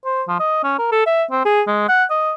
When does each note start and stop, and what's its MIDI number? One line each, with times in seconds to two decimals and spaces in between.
0.05 0.23 72
0.28 0.36 53
0.40 0.60 75
0.64 0.74 61
0.79 0.91 70
0.92 1.05 69
1.06 1.23 76
1.31 1.45 60
1.45 1.61 68
1.67 1.85 56
1.89 2.04 78
2.10 2.33 75